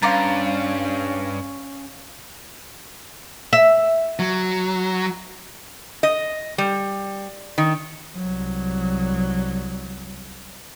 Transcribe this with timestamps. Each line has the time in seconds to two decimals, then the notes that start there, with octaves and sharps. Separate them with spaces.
0.02 G2 C#4 F5 A#5 C6 D6 A6
3.53 E5
4.19 F#3
6.03 D#5
6.58 G3
7.58 D#3
8.17 C2 F#3